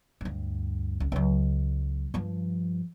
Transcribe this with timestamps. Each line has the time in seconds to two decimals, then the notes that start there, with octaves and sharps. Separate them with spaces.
0.21 D2 G2
1.00 C#2
1.12 C#2 F#3
2.14 G2 F3